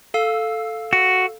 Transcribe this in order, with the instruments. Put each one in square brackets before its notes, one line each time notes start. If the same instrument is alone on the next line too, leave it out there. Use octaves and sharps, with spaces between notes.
[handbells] A4 F5 E6
[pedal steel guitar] F#4